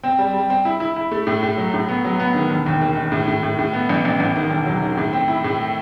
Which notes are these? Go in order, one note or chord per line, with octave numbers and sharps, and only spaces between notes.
C4
G3
G3
C4
E4
E4
E4
A3
A2
A2
F#3
A2
B3
F#3
B3
D#3
E1
D#2
D#3
D#3
A2
A2
A2
A2
B3
A1
A1
A1
D#3
E1
F#3
D#3
A2
C4
E4
A2